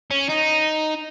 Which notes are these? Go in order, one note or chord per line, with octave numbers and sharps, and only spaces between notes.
C#4
D#4